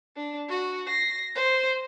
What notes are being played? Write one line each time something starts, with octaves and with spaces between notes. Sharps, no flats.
D4
F#4
A#6 C7
C5